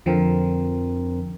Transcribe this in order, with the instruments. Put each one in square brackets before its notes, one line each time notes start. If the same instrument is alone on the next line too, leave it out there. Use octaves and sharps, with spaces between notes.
[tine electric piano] F2 C4 A#4 [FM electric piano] D3 F3